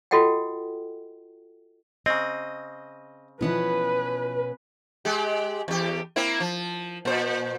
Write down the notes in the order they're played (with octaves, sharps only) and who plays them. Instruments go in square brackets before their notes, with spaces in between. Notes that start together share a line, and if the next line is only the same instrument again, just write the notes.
[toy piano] F4 F#4 A4 D#5 F#5 G5
[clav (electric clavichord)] C#3 C4 [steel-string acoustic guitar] D#5
[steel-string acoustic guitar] B2 B3 C#4 [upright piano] E3 F3 [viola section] B4
[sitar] G#3 G4
E2 G4
A#3 C4 E4
F3
A#2 C5